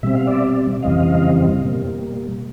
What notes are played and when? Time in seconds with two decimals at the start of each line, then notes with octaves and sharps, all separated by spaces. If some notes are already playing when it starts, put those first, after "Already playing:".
0.03 B2 G3 C4 E5
0.15 F5
0.27 D5 E5
0.82 F2 C#3 E3 G3 C4 D#5 F5
1.64 B2 G3 A#3